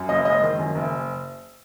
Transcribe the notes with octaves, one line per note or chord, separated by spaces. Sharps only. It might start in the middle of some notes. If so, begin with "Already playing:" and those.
Already playing: F#2
F#1 D#5
G#3 D#5
D#3
F#2
F#1